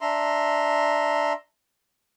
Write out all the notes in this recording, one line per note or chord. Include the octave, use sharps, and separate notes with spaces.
D4 E5 A#5 C6